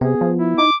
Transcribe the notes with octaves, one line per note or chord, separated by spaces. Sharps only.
C3 B3 G#4
F3
E4
D#4 D6